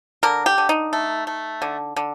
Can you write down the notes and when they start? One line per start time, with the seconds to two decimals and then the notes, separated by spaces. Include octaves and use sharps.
0.23 D3 A#4
0.46 G4
0.58 D3
0.69 D#4
0.93 A3
1.27 A3
1.62 D3
1.96 D3